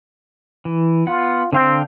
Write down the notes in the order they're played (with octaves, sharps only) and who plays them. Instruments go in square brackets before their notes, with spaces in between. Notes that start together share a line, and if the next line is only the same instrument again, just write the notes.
[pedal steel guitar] E3
[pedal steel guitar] B3 F#5 [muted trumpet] F4
[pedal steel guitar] D3 F5 G5 [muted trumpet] C4